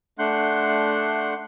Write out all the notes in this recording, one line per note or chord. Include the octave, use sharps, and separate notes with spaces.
A3 D4 F#5 C6 F#6 G6